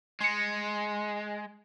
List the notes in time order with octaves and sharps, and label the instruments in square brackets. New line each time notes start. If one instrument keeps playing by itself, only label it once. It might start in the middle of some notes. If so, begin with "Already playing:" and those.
[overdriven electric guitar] G#3 [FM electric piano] C6 C#7